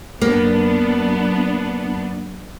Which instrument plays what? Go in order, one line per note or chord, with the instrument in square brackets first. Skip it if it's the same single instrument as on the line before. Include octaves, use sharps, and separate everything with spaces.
[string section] F#2 B3 D4 [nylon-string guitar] A#3